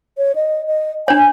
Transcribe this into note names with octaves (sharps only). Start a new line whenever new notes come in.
C#5
D#5
D#5
D4 C#5 G#5